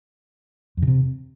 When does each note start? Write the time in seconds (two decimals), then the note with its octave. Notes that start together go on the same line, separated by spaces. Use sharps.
0.77 F2
0.82 C#3
0.87 C3